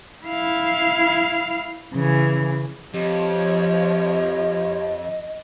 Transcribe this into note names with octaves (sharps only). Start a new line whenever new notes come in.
E4 F5
C#3 E3
F2 F3 G4 C#5 D#5